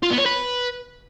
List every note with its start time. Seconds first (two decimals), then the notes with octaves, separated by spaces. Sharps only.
0.03 F4
0.11 B3
0.18 C#5
0.26 B4